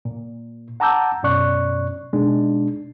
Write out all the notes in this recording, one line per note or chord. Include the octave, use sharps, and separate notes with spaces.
A#2
F#5 A5 A#5 D6 E6 G6
F#2 B2 C#4 D5 C#6 F#6
B2 G#3 D4 D#4